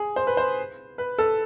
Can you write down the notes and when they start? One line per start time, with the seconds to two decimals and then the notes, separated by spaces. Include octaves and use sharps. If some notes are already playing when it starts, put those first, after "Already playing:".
Already playing: G#4
0.16 C5
0.27 B4
0.37 C5
0.98 B4
1.18 A4